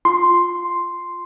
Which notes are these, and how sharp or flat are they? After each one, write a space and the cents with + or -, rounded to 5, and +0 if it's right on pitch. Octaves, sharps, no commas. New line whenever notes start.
F4 +5 C6 +0